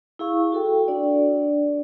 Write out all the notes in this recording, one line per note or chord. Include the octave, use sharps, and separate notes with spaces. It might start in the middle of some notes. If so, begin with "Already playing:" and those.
E4 G#4 F5 C#6
F#4 A4 G5
D4 D5